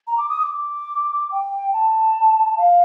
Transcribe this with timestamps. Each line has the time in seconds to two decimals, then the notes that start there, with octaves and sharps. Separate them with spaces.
0.07 A#5
0.18 D6
0.29 D#6
0.39 D#6
0.43 D6
1.32 G5
1.73 A5
2.57 F5